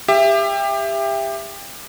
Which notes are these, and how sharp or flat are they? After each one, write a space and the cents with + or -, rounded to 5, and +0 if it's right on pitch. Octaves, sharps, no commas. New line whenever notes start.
G4 +25 E5 +20